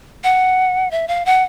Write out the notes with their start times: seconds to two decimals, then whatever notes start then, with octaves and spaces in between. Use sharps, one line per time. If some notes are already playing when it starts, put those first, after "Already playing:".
0.23 F#5
0.91 E5
1.08 F5
1.25 F#5